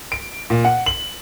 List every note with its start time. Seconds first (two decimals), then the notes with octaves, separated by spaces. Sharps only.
0.12 D7
0.50 A#2
0.65 F#5
0.86 F#7